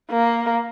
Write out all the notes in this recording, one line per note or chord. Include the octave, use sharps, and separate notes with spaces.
A#3